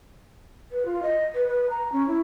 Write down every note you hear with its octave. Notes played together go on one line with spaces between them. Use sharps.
B4
F4
D#5
B4
B4
A#5
C#4
E4